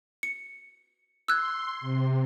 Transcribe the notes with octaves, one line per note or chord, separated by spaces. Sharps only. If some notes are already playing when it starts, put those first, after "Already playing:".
C#7
C6 E6 F#6 G#6
C3